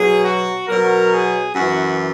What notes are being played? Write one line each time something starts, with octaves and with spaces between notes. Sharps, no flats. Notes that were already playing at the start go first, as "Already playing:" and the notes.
Already playing: B2 F#3 G#4
F#4
B2 F#3 A#4
G#4
F#2 E3 F#4